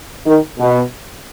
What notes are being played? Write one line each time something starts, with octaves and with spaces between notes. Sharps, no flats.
D#3
B2